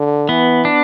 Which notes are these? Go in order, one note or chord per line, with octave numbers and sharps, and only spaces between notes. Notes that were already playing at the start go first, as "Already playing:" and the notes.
Already playing: D3
E3 B3
D4